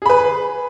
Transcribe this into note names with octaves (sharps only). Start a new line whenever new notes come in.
G#4 B4 B5